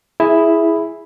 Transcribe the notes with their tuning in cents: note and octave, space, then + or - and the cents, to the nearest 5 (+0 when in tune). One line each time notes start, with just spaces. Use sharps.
E4 +0 G#4 +0